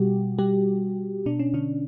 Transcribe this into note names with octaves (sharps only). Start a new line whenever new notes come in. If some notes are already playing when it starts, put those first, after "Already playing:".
Already playing: B2 G3 F#4 G4
G3 G4
B2 D4
C#4
D3 D4